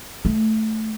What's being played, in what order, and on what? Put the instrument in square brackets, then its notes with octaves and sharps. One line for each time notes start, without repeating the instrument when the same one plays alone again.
[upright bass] A3